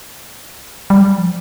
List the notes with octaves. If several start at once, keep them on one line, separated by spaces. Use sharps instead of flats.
G3
F3